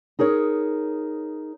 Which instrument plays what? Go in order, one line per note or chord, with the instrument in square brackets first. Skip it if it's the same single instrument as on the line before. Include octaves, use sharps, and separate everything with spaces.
[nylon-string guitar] D#4 G#4 A#4 C#5